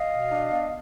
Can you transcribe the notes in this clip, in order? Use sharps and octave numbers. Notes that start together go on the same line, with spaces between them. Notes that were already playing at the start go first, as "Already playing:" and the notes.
Already playing: D#5 F5
B2
D4
B3